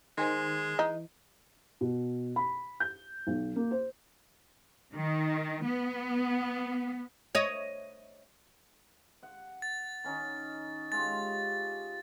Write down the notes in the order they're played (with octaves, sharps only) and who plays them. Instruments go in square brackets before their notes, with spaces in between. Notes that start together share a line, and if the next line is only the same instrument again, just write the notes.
[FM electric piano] D#3 [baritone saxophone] G#3 [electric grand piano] C5 G#5 C6
[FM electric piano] E3 [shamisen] D#4
[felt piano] B2
B5
G6
B1
A#3
C5
[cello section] D#3
B3
[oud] C#5 D#5
[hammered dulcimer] F#5
[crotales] A6
[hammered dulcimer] D#3 C#4 D#4
[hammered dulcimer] G#3 F4 G4 [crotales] A6